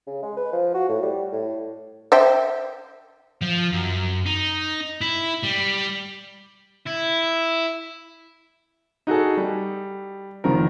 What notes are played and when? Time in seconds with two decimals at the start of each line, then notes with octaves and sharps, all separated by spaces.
0.07 C#3
0.23 G#3
0.37 B4
0.53 F3
0.74 F#4
0.89 A2
1.02 G3
1.32 A2
2.12 C5 E5 G5
3.42 F3
3.73 F#2
4.26 D#4
5.01 E4
5.44 G3
6.86 E4
9.07 D#4 F#4 G#4 A4
9.37 G3
10.44 F1 D#3 F3 A#4